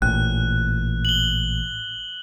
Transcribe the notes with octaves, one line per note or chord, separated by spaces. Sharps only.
A1 A#2 F#6
F#7 G7